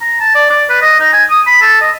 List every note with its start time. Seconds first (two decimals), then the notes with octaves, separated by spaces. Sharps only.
0.01 A#5
0.20 A5
0.35 D5
0.50 D5
0.70 B4
0.82 D#5
1.00 D#4
1.13 G#5
1.30 D#6
1.47 B5
1.62 A4
1.81 D#5